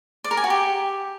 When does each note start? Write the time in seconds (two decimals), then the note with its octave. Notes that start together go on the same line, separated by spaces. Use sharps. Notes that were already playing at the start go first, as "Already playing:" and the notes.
0.24 D5
0.31 A#4
0.37 G#5
0.44 F#4
0.50 G4